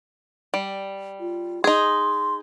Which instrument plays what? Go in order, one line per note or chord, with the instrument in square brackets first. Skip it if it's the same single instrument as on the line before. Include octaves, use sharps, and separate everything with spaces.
[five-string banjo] G3
[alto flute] F4
[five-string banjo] D#4 G#4 [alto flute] C6